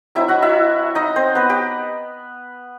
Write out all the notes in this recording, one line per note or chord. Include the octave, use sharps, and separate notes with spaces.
F#3 C4 D#4 E4 E5
F#4 F#5
E4 E5
D#4 D#5
C4 C5
B3 B4
G4